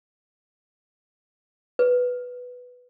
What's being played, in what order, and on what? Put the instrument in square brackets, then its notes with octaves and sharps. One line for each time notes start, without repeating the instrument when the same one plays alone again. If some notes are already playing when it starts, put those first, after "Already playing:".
[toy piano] B4